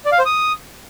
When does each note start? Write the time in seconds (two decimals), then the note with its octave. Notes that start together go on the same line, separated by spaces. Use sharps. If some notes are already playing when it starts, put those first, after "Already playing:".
0.05 D5
0.12 F5
0.19 C5
0.25 D#6